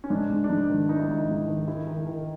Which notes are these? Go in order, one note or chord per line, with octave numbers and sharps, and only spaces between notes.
C#4
G#2 D4
G#2
D4
G#2 D#4
D#3
D#3 D#4
E4
G#2 D#4
G#2
D#3
D#3 E4
D#3
D#3